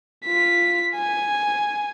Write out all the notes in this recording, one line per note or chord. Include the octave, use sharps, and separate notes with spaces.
F4 B6
G#5